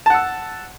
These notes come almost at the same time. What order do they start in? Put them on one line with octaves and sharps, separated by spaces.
A5 F#5 E6